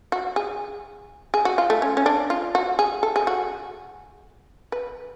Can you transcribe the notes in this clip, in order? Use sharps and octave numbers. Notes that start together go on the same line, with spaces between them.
F#4
G#4
G#4
F#4
F4
A3
C#4
C#4
D4
F4
F#4
G#4
A4
G#4
F#4
B4